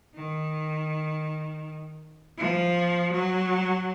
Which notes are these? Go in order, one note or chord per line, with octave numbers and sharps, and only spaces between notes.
D#3
F3
F#3